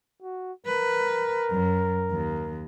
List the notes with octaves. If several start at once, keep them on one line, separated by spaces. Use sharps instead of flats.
F#4
A#4 B4
F#2
D#2